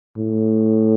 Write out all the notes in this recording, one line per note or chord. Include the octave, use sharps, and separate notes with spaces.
A2